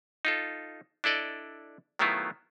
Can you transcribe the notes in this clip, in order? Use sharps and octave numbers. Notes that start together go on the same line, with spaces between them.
D#4 F4 A4
D4 E4 A4 D5 D#5
D#3 F#3 A3 B3 E4 F4